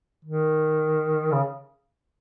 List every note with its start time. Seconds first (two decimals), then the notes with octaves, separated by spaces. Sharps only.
0.25 D#3
1.31 C#3